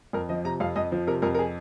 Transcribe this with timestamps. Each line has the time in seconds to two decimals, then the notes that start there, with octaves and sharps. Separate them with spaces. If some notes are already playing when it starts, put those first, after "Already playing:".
0.13 F2 A#4
0.29 F3 D#5
0.45 C3 A#5
0.60 F2 F5
0.76 F2 D#5
0.92 F3
1.07 C3 A#4
1.22 F2 A#4
1.35 A#4
1.39 G#4